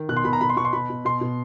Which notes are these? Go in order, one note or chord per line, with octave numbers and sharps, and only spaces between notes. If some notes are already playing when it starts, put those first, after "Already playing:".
Already playing: D#3
B2 F#6
C6
B2 B5
A#5
B2 B5
C6
B2 C#6
C6
B2 B5
B2
B2 C6
B2